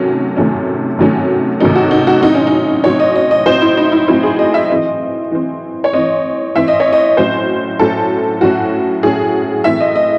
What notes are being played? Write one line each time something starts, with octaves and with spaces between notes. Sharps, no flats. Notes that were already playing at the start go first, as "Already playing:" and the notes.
Already playing: C3 D#3 F#3 A3 C#4
C3 D#3 F#3 A3 C#4
C3 D#3 F#3 A3 C#4
C3 D#3 F#3 A3 C#4 D#4
F#4
D#4
F#4
A2 F#3 C4 D#4
C#4
D#4
A2 F#3 C4 C#5
D#5
D#5
D#5
A2 F#3 C4 C5
E4
D#4
E4
A2 F#3 C4 E4
G#4
D#5
E5
E3 C4 D#5
E3 C4
C#5
E3 C4 D#5
E3 C4 E5
D#5
C#5
D#5
A2 F#3 C#4 C5
A2 F#3 C#4 A4
A2 F#3 C#4 F#4
A2 F#3 C#4 G#4
A2 E3 C4 E5
D#5
D#5